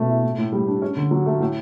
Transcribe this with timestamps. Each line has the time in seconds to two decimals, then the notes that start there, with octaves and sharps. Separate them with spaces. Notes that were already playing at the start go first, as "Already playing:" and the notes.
Already playing: B2 A3 C#4
0.09 E4
0.24 A2
0.38 A2
0.52 G3
0.68 D4
0.82 C#4
0.97 D3
1.11 F#3
1.26 A3
1.40 A2